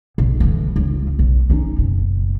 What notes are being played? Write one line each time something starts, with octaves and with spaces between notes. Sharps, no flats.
B1
D3 E3
C#2 F4
B1
C#4 D#4
F#1 B2